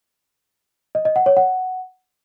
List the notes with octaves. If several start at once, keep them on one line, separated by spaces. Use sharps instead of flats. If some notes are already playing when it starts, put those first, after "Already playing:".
D#5
D#5
F#5
C#5
F#5